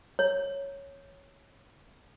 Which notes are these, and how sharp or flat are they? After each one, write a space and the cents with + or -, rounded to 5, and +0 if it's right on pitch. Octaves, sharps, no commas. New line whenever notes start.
C#5 +0